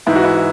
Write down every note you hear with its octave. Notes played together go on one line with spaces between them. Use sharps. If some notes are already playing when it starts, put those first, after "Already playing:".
G#2 E3 E4
F#4
E4